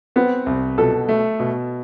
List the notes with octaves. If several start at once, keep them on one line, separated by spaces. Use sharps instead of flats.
B3 C4
C2
B2 A4
A3
B2